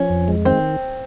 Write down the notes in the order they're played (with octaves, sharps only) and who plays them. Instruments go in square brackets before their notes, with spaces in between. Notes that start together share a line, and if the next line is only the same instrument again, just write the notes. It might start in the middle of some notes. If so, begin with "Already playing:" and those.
Already playing: [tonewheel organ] F3 [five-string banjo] C#4
[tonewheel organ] F2
G#3
[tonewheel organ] D#3 [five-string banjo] C4